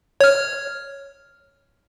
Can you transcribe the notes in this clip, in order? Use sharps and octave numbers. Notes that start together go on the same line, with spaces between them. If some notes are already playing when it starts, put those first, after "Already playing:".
C#5 F6